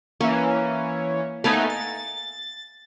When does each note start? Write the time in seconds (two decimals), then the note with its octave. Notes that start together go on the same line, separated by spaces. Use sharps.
0.21 E3 A#3 C#4
1.44 A3 B3 D#4 A#4 F5 G#5
1.70 A6